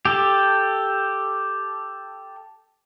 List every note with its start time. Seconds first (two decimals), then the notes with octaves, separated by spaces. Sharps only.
0.05 G4 A4